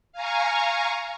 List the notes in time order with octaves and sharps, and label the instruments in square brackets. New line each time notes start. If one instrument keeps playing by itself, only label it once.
[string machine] F5 G#5 A#5 C#6